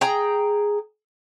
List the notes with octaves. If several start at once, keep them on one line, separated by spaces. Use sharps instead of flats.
G#4 G5 A#5